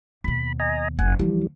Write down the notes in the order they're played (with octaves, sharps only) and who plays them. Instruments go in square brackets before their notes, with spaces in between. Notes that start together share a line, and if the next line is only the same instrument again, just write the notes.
[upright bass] D#2 B2 [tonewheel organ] B5
[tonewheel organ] D#5 G#5 A#5
[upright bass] F#1 [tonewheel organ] F#5 G#5
[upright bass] D2 F3 [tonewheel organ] E3 G3